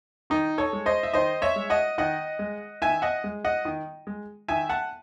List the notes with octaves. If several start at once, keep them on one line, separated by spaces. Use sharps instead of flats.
D#3 D#4
A4 C#5
G#3
C5 D#5
E5
D#3 C5 D#5
C#5 E5
G#3
D#5 F#5
D#3 D#5 F#5
G#3
D#3 E5 G#5
D#5 F#5
G#3
D#5 F#5
D#3
G#3
D#3 E5 G#5
F#5 A5